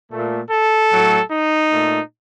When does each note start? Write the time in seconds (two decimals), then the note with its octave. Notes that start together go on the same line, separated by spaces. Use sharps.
0.12 A#2 A3
0.51 A4
0.91 A2 F#3 A3
1.30 D#4
1.70 A#2 A3